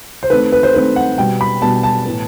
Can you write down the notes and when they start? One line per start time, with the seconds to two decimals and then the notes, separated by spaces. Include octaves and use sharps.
0.23 C5
0.30 D#3 A3 C4 B4
0.52 B4
0.63 C5
0.74 D#3 A3 C4 B4
0.96 F#5
1.18 B2 G3 B3 G5
1.41 B5
1.62 B2 G3 B3 A5
1.83 A5
2.05 A2 E3 B3